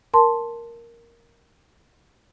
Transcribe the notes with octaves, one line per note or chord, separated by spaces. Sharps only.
A#4 A5 C6